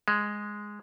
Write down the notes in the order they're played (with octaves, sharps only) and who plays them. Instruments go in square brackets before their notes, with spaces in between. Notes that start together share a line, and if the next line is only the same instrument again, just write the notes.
[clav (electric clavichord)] G#3